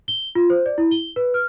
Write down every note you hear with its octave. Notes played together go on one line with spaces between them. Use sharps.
G7
F4
C5
D5
E4
G7
B4
F6